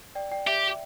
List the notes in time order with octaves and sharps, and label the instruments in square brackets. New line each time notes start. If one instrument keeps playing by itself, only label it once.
[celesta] D5 G5
D5 G5
[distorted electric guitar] G4 [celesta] E5